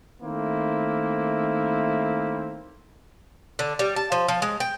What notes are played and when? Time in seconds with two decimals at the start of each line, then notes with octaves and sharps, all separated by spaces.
0.22 D#3 A3 A#3 C4 E4
3.59 D3
3.79 G3
3.96 A5
4.12 F3
4.28 F3
4.42 G#3
4.60 G5